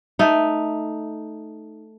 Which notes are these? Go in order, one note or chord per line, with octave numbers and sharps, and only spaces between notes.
A3 D#4